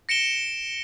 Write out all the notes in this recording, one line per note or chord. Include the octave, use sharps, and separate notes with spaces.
A#6 C#7 D7 E7 G7